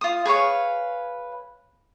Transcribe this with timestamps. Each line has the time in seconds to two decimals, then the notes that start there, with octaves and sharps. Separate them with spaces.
0.01 F4 D#6
0.25 G#4 B4 C#5 F5